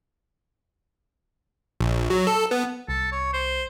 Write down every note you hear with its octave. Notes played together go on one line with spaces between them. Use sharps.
A#1
F#3
A4
B3
C2 A4
C#5
C5